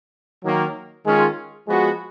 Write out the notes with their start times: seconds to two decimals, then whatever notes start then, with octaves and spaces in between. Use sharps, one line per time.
0.44 D#3 F#3 A#3
1.05 D#3 G#3 C#4 F4
1.67 F3 G#3 B3 F#4 B4